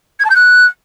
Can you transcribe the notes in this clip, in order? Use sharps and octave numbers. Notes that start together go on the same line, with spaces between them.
G#6
A5
G6
F#6